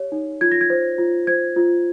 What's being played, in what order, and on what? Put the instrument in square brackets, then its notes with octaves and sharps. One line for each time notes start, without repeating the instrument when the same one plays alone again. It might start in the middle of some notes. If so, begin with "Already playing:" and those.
Already playing: [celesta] G4 C#5
D#4
F4 G#6
A#6
G#6
C5
F4
C5 G#6
F4